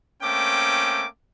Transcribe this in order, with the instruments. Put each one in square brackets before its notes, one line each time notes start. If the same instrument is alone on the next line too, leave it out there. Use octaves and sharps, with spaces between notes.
[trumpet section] A3 A#3 C4 C#4 G5 D6